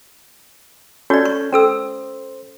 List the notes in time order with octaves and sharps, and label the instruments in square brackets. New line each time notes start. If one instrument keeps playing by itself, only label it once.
[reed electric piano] C#4 A4 G6 [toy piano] F#4 D5
[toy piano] C#6
[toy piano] C#4 A4 E6 [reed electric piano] C5